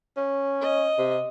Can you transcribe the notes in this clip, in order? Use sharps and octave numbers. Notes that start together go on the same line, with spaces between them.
C#4
D#5
C3